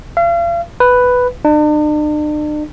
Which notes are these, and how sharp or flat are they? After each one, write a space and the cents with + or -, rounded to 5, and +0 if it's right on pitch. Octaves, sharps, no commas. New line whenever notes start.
F5 -40
B4 +5
D4 +45